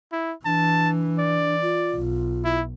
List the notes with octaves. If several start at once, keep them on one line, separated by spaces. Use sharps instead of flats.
E4
E3 D4 A5
D5
F4
B1
E4